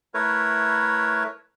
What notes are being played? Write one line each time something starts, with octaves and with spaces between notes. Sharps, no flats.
A3 E4 A#4 B4 C#5